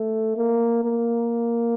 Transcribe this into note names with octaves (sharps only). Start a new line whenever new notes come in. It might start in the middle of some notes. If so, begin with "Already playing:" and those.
Already playing: A3
A#3
A#3